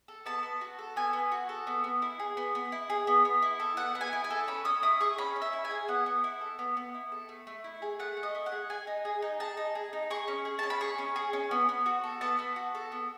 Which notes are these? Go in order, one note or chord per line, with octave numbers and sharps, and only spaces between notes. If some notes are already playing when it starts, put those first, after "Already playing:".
A4
B3 A5
B3
F#4
A4
B3 G#5
B3
F#4
A4
B3
B3
E4
G#4
B3
B3
E4
G#4
B3
B3
E4
A4
B3 F#5
B3
G#5
E4
G#5
A4
C#4 B5
C#4 D#6
E4 D#6
G#4 C#6
C#4 B5
C#4
E5
E4
G#5
G#4
B3 F#5
B3
E4
A4
B3
B3
E4
A4
A3
A3
E4
G#4
A3 F#5
A3
D#5
E4
F#5
G#4
G#4 G#5
D#4
G#4
D#4
G#4 A5
D#4
G#4
D#4
G#4 C#6
C#4
G#4
C#4 A5
B5
G#4 C#6
C#4
G#4
C#4
B3
B3
F#4
A4
B3 A5
B3
F#4
A4
B3